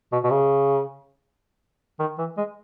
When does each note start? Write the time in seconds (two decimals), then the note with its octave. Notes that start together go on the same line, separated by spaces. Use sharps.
0.12 B2
0.24 B2
0.31 C#3
2.00 D#3
2.18 E3
2.37 G#3